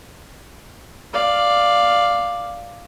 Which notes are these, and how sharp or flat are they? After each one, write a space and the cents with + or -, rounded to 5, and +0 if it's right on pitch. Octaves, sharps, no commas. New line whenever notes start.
D5 +5 F5 +0